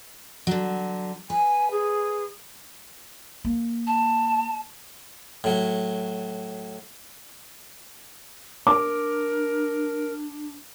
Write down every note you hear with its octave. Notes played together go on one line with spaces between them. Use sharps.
D3 F#3
B4 G#5
G#4
A#3
A5
A2 F#3
D4 A#4 D6